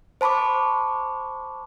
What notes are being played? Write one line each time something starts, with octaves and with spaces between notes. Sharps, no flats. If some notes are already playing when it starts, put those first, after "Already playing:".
C5 A5 B5 C#6 D6